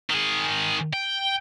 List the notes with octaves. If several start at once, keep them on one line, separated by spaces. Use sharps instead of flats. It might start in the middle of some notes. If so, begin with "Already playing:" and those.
D#3 G#4
G5